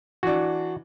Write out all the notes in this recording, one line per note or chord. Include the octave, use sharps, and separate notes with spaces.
E3 D4 F#4